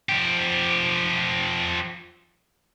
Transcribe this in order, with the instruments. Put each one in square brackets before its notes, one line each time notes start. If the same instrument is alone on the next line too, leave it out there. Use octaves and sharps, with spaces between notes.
[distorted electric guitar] F3 G4